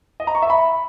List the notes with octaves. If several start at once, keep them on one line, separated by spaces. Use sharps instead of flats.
D#5
A#5
C#6
E5
B5